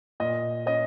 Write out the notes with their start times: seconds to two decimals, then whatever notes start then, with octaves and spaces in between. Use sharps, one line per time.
0.20 A#2 D#5
0.66 C#4 D#5